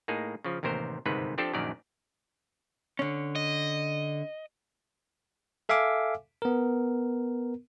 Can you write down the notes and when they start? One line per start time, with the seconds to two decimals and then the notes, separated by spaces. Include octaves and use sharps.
0.08 A2 A#3 D#4 G#4
0.45 C#3 F3
0.63 A1 D#2 C3 A#4 C5
1.05 G1 G#2 C3 D#3 B4
1.38 F3 C4 D4 G4 A4 C5
1.53 A#1 F#2 D#3 A#4 D5
2.99 D3 C#4
3.35 D#5
5.69 A4 E5 F5 G#5 D6
6.42 B3 A#4